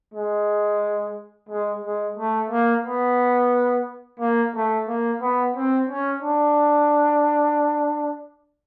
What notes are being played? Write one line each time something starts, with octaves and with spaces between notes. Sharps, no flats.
G#3
G#3
G#3
A3
A#3
B3
A#3
A3
A#3
B3
C4
C#4
D4